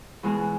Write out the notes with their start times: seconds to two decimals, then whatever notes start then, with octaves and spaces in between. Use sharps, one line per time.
0.23 E2 B2 G#3 B3 G#4